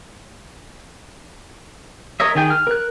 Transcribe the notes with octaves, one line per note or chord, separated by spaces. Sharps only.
A#4 C#5 D#5 E5
D#3 G#4 G5
F6
A#4 F#6